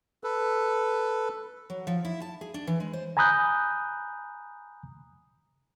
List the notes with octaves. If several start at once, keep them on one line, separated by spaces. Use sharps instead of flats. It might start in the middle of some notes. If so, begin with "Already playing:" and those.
A4 B4
F#3
F3
E4
A5
G#4
D4
E3
G#3
C5
G#5 A#5 B5 D#6 F#6 G6